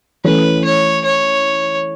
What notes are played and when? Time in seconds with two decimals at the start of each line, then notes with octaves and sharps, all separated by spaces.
0.24 E3 A3 C#4 B4
0.65 C#5
1.04 C#5